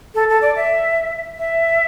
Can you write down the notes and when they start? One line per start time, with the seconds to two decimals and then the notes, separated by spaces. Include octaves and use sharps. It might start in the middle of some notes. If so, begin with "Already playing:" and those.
0.15 A4
0.29 A4
0.42 D5
0.56 E5
1.38 E5